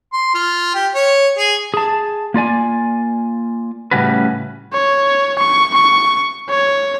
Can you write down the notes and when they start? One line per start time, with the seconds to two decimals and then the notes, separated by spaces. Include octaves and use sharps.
0.13 C6
0.34 F4
0.74 G4
0.95 C#5
1.38 G#4
1.74 G#4 A5
2.34 A#3 F4 D5 G#5
3.91 A2 C#3 G3 C#4 F#4 B4
4.73 C#5
5.39 C#6
5.74 C#6
6.49 C#5